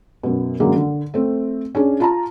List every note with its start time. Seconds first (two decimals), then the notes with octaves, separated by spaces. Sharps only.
0.23 F#2 B2
0.60 F#2 D3 F#3 G#3 A#3
0.76 D3
1.14 A3 C4
1.75 C#4 D4 G#4
2.00 F4 A5 A#5